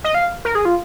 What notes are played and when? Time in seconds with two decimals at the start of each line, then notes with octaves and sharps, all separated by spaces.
0.04 D#5
0.14 F5
0.45 A#4
0.55 G#4
0.65 F4